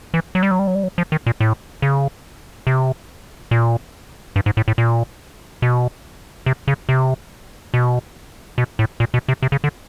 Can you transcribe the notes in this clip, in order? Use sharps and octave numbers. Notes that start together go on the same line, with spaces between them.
E3
F#3
G3
F#3
G3
F#3
G3
F#3
F3
D#3
A#2
A2
C#3
C3
A#2
G2
G#2
A2
A2
A#2
B2
C3
C#3
C3
B2
B2
A2
A#2
B2
C3
C3
C#3
D3